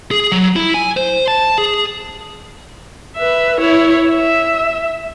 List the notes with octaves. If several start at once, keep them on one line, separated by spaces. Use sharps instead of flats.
G#4
F#3
E4
G#5
C5
A5
G#4
B4 E5
E4 C#5
E5